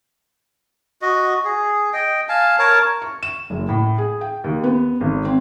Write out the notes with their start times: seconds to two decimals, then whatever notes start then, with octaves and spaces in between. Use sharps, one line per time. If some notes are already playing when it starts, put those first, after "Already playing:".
1.02 F#4 D#5
1.45 G#4
1.93 D#5 G5
2.29 F5 G#5 A5
2.59 A#4 C#5 A5
3.02 C#6
3.23 E7
3.50 F#1
3.69 A2
3.98 G#4
4.21 G5
4.44 D#2
4.64 B3
5.01 G#1
5.25 C4